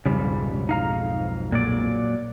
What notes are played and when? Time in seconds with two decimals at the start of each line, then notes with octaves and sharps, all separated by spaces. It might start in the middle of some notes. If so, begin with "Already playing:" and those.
0.06 B1 F2 G#2 C#3 G3
0.69 D#4 F5 A#5
1.52 A#2 F#3 D5